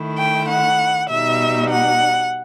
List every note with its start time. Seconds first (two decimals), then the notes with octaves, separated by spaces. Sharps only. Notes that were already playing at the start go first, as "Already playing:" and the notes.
Already playing: D#3 A3 E4
0.19 G5
0.50 F#5
1.10 B2 G3 D#4 E5
1.71 F#5